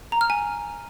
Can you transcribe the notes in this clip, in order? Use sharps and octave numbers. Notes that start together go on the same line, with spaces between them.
A#5
F6
G#5